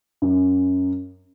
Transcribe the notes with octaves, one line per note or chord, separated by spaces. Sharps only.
F#2